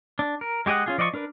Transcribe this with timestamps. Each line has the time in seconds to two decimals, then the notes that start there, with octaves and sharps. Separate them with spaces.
0.19 D4
0.41 A#4
0.66 G#3 G4 G#4 D#5 F#5
0.86 C#4 F4 G#4
0.98 F3 D5 D#5 F5 C#6
1.14 D4 A#4 B4